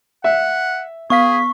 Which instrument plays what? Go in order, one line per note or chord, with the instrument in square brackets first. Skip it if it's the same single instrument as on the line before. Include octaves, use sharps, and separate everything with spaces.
[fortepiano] E5 [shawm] F#5
[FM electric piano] B3 F5 B6 [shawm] G#4 [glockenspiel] C#6